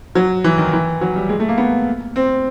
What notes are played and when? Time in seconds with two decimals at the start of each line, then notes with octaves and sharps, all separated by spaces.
0.15 F#3
0.44 E3
0.58 D#3
0.73 E3
1.01 F#3
1.16 G3
1.29 G#3
1.40 A3
1.49 A#3
1.58 B3
2.16 C4